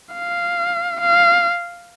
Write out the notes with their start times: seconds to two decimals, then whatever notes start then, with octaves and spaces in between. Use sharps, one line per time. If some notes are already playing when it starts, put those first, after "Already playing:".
0.15 F5
1.01 F5